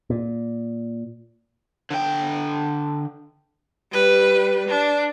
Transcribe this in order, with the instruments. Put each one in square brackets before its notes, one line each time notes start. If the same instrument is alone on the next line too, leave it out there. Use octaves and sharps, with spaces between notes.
[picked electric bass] A#2
[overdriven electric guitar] D3 G5
[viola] G3 B4
D4